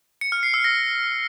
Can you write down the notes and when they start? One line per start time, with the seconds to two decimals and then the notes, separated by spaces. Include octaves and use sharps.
0.21 C#7
0.32 F6
0.43 C7
0.54 E6
0.64 A#6